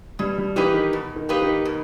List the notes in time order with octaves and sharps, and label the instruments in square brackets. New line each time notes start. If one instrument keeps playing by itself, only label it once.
[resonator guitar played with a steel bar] B2 [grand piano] G3
[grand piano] G3
[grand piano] E3 [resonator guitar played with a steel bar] A#3 D#4 G4 B4
[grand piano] D#3
[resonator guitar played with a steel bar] B2
[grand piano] D#3
[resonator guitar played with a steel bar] A#3 D#4 G4 B4
[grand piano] D#3
[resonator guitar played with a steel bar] B2